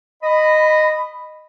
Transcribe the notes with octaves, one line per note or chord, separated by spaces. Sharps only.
D#5 B5